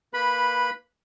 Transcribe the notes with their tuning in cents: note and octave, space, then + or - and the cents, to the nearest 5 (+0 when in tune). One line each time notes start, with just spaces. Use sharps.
A#3 +0 B4 -10 B5 +0